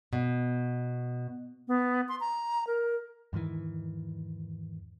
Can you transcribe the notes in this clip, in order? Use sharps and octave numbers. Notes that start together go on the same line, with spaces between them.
B2
B3
C6
A#5
A#4
E2 G#2 D#3 E3